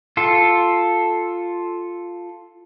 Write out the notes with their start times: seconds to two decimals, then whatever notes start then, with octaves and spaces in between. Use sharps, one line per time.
0.17 F4 A4